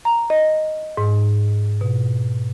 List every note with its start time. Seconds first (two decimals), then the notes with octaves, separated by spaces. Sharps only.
0.05 A#5
0.30 D#5
0.97 G#2
1.81 B2